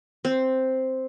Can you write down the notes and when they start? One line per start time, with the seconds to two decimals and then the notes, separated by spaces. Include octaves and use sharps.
0.25 C4